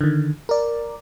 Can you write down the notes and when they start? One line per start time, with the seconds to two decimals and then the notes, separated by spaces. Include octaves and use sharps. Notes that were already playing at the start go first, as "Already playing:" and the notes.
0.01 D3 D#3
0.49 A#4 D5